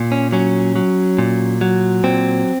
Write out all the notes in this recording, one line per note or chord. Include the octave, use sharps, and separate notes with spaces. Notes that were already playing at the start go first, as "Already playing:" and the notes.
Already playing: A#2
C#4
F#3 C#4
F#3
A#2
F#3
A#2 C4